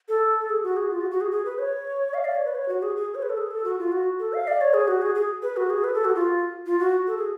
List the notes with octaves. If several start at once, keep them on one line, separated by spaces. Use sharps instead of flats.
A4
G#4
F#4
G#4
F4
F#4
F#4
G#4
G#4
B4
C#5
F5
D5
C#5
B4
C#5
F#4
G#4
G#4
C#5
B4
A4
G#4
A4
F#4
F4
F#4
A4
F5
D5
C#5
G#4
F#4
G#4
G#4
B4
F#4
G#4
B4
A4
F#4
F4
F4
F#4
A4
G#4